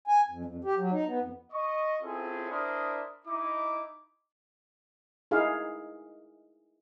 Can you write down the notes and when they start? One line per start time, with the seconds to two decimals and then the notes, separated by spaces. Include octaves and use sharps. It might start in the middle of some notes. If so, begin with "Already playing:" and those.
0.07 G#5
0.30 F2
0.45 F2
0.64 G4
0.77 F#3
0.92 D#4
1.06 B3
1.21 F2
1.52 D#5 C#6
2.02 C4 C#4 E4 F4 G#4 A4
2.50 D4 E4 A#4 C5 D#6
3.27 D#4 E4 D6
5.31 D#4 E4 G#4 F5